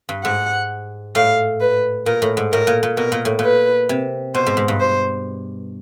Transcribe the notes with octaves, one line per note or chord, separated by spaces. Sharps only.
G2
G#2 F#5
A2 F5
B4
A#2 A#4
A2
G#2
A2 A#4
A#2
A#2
B2 A#4
A#2
A2
A#2 B4
C3
B2 C5
G#2
G#2
G2
C5